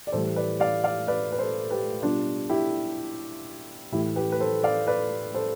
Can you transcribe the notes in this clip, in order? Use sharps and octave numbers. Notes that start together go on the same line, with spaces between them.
D5
A2 E3 G3 A4 C5
B4 D5
D5 F5
D5 F5
B4 D5
B4
A4 C5
G4 B4
B2 G3 D4 F4
E4 G4
A2 E3 A3 E4 G4
G4 B4
B4
A4 C5
D5 F5
B4 D5
A4 C5